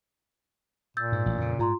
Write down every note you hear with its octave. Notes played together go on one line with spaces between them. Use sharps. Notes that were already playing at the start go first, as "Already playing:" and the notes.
A#2 E6 G6 A6
G#2
A1
F2 C#3
G#2 F4 A#5 C6